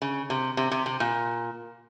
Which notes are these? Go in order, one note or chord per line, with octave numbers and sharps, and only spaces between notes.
C#3
C3
C3
C3
C3
A#2